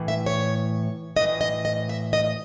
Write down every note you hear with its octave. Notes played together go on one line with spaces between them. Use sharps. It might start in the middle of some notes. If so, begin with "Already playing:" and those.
Already playing: A2 E3
E5
C#5
A2 E3 D#5
D#5
D#5
E5
D#5